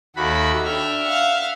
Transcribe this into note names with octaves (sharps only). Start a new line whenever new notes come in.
D#2 F#4 A4 E5 B5
D4 E5 G5 F6
F5 F#5